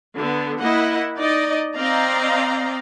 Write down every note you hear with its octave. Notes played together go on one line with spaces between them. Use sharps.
D3 B3
A#3 E4 D#5 F#5
D#4 D5 D#5
C4 D5 D#5 F5 A#5